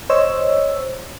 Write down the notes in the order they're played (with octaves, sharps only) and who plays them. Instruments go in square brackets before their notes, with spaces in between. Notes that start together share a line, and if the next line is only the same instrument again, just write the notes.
[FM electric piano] C5 C#5 D#5 E6